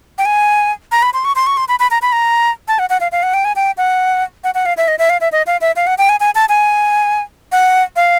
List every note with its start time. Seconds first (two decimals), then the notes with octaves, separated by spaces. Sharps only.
0.18 G5
0.25 G#5
0.92 A#5
1.02 B5
1.14 C6
1.25 C#6
1.36 C6
1.47 C#6
1.57 C6
1.68 B5
1.80 B5
1.91 A#5
2.02 B5
2.12 A#5
2.68 A5
2.79 F#5
2.90 F#5
3.00 F5
3.12 F5
3.23 F#5
3.34 G5
3.45 G#5
3.56 G5
3.77 F#5
4.44 F#5
4.55 F#5
4.66 F5
4.77 E5
4.88 D#5
4.99 E5
5.10 F5
5.21 E5
5.32 D#5
5.47 F5
5.61 E5
5.76 F5
5.87 F#5
5.98 G5
6.09 G#5
6.20 G#5
6.35 A5
6.49 G#5
7.52 F#5
7.96 F5